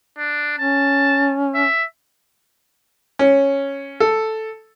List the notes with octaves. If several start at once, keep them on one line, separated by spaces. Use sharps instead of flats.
D4
C#4 A5
E5
C#4
A4